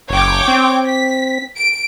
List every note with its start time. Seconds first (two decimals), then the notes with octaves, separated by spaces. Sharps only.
0.10 F#1 C#5 G5 D6
0.48 C4
0.86 B6
1.56 D7